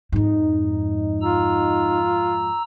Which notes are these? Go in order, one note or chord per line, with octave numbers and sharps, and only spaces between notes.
F2 G#2 D#4
F4 A#5 E6